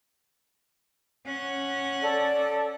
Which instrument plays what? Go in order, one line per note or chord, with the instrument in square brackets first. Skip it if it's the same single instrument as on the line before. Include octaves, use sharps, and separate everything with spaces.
[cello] C#4 F#5
[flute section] A4 D5